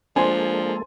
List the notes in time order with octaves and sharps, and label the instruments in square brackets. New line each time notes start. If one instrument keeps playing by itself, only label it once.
[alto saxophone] F3 [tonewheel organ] G#3 A#3 A4 [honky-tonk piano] D4 C5 [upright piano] G#5 C6